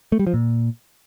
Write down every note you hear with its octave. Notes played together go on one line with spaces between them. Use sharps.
A3
G3
F3
A#2